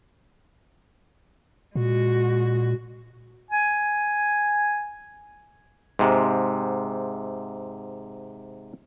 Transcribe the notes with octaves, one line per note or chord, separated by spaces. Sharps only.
A#2 G#3 F#4
G#5
G#2 C3